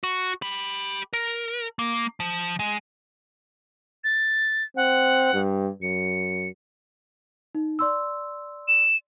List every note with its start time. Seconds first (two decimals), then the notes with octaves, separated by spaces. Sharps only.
0.04 F#4
0.42 G4 B5
1.13 A#4
1.79 A#3
2.20 F3
2.59 G#3
4.04 A6
4.76 C4 F#5
5.34 G2
5.82 F#2 C#7
7.55 D#4
7.79 D5 C6 E6
8.68 E7